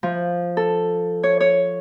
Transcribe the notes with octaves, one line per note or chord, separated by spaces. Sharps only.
F3
A4
C#5
C#5